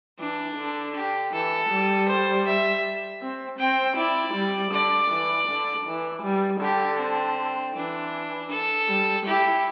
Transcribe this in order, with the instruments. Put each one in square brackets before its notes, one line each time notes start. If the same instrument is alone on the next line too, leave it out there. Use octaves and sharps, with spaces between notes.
[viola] E3 [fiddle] D4
[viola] D3
[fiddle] G4
[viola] E3 [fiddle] A4
[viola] G3
[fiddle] C5
E5
[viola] C4
[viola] C4 [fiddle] G5
[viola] E4 [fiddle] D5
[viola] G3
[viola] D3 [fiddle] D5
[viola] E3
D3
E3
G3
[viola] D3 [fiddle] G4
[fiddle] C4
[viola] E3 [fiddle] D4
[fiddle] A4
[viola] G3
[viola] E4 [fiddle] G4